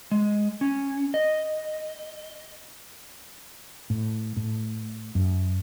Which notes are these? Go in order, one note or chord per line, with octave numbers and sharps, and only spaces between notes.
G#3
C#4
D#5
A2
A2
F#2